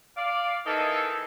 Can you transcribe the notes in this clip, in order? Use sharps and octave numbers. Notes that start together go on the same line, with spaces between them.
D5 F5
D#3 E3 D#4 G#4 A4